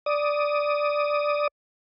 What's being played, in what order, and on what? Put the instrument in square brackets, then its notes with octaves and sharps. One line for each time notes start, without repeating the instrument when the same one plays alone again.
[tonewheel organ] D5 D#6